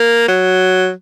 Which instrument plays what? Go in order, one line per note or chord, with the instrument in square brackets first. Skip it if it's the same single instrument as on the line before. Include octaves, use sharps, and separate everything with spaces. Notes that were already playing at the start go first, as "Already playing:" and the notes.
Already playing: [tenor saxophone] A#3
F#3